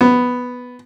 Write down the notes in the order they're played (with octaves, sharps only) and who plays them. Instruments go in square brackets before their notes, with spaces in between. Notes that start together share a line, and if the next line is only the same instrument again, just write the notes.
[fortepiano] B3